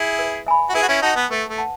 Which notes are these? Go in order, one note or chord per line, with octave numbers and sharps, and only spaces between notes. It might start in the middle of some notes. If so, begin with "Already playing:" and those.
Already playing: E4 G#4
B4
E5 G#5 B5
F#4
E4 G#4 B4
F#4
C#4 E4
D#4 F#4 F#5 A5
B3
A3 B4
A3
F#5 A5